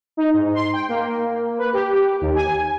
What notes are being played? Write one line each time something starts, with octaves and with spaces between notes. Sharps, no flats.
D#4
G#2
C6
G5
A#3
B4
G4
D#2
G#5